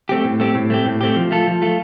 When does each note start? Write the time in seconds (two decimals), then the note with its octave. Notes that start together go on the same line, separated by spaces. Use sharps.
0.09 A3 C4 G4
0.24 A2
0.40 A3 C4 G4
0.55 A2
0.70 A3 C4 G4
0.86 A2
1.01 A3 C4 G4
1.16 F3
1.31 A3 F4 A4
1.47 F3
1.62 A3 F4 A4